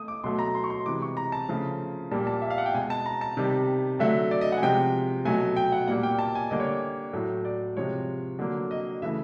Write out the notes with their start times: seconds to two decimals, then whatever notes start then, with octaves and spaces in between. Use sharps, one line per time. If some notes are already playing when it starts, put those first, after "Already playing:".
Already playing: A3 D#6
0.08 D6
0.24 B2 F#3 A3 C6
0.39 A#5
0.55 C6
0.64 C#6
0.70 C6
0.85 C3 E3 G#3 D6
1.02 C#6
1.17 A#5
1.32 A5
1.49 C#3 F3 A3
2.11 A#2 G3 A#3 A5
2.27 A5
2.42 E5
2.50 F5
2.58 F#5
2.66 G5
2.74 B2 G#3 G#5
2.90 A5
3.06 A#5
3.21 A5
3.37 C3 D#3 G3
3.99 D3 F#3 A3 E5
4.31 D5
4.41 D#5
4.52 F#5
4.57 G#5
4.62 C3 F3 G#3 G5
5.25 B2 F#3 A3 G#5
5.56 G5
5.72 F#5
5.88 A#2 G3 A#3 F#5
6.03 G5
6.19 A5
6.35 G#5
6.51 D3 G3 A#3 D#5
6.60 C#5
6.67 D5
7.13 A2 F#3 A3
7.45 D5
7.76 C3 F3 G#3 C#5
8.39 D3 F#3 A#3
8.71 D#5
9.02 C#3 E3 A3 E5